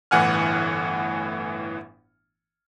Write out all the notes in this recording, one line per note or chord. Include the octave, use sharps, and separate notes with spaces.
G1 A2 E3 F#5 G#5 F6